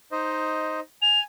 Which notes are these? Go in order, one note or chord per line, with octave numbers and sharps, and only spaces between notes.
D#4 C5 D#5
G#5 F7